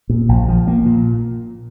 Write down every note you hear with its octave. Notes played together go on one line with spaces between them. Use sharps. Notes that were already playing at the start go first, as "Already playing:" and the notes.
A#2
A#1
F3
A#3
A#2